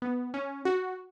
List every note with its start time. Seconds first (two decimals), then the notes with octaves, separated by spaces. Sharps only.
0.02 B3
0.34 C#4
0.65 F#4